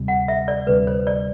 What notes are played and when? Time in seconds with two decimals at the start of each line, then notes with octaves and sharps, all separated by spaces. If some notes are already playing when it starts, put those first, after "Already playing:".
Already playing: D2 C3 G3
0.08 F#5
0.28 E5
0.48 D5
0.67 D2 C3 G3 B4
0.87 C5
1.07 D5